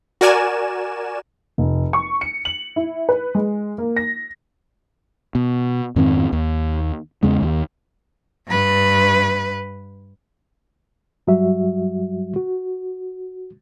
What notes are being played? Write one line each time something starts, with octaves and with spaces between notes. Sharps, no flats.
F#4 A#4 D5 G#5 E7
F1
C#6
C#7
F#7
E4
B4
G#3
A#3
A#6
B2
F2 G#2 D#3 C4
D#2
E2 C#3 G#3
D#2
G2 B4
G2 F#3 G3 F#4 E5
F#4